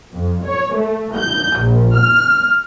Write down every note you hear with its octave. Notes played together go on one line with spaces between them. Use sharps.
F2
C#5
A3
G6
A#1
F6